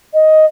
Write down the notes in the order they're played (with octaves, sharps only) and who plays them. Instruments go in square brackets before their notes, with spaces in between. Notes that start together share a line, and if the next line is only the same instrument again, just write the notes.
[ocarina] D#5